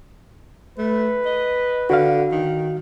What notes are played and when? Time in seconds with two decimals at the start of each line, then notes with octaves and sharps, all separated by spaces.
0.78 A3 B4
1.26 D#5
1.90 D3 F#4 F5
2.32 D#3